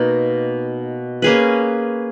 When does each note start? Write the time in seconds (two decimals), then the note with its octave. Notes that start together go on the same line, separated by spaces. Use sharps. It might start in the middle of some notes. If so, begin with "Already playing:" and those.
Already playing: B2 A#3 D#4
1.22 A#3 C#4 G#4 B4